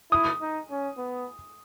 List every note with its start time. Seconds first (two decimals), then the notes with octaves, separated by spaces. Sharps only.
0.11 E4 D#6
0.41 D#4
0.70 C#4
0.98 B3